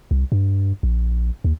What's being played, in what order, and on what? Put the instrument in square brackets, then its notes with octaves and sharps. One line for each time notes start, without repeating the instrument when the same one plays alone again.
[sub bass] C2
G2
A#1
D#2